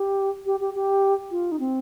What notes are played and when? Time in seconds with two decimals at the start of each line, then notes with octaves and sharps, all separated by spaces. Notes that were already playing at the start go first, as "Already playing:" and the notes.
Already playing: G4
0.46 G4
0.60 G4
0.75 G4
1.31 F4
1.52 D#4
1.60 C4